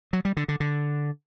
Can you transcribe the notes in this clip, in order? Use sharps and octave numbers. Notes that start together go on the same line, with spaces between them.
F#3
G3
D3
D3
D3